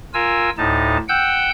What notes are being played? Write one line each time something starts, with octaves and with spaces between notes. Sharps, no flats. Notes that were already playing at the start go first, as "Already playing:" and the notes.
F4 A#4 G#5 E6
D2 A2 D#4 A5
F#5 G5 E6 G6